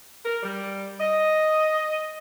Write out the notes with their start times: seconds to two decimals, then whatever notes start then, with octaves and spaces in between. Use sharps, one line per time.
0.25 A#4
0.42 G3
1.00 D#5